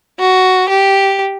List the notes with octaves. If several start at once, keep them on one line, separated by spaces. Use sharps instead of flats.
F#4
G4